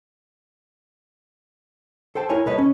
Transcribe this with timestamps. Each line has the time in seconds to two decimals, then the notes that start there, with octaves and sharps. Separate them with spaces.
2.15 A4 C5 G5 A5
2.29 E4 A#4 C#5 G#5
2.46 C2 A4 B4 C#5 D#5
2.58 C#4